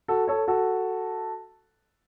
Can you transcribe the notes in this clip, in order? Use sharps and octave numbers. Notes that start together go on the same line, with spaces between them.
F#4 A4
A4 C#5
F#4 A4